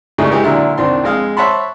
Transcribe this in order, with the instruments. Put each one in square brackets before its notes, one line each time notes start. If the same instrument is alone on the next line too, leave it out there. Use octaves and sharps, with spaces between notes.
[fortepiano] G#2 C#3 G3 A3 D#4
E3 G#3 D#4 G4
A#2 D3 F#3 E4
C2 D#3 C4 D4 C6
F2 G#3 F5 D#6
C#5 E5 F#5 A5 B5 C6